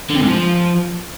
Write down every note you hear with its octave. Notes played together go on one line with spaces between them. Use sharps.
D3
C3
G#2
F3